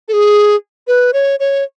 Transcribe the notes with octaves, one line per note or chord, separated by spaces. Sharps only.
A4
G#4
B4
C#5
C#5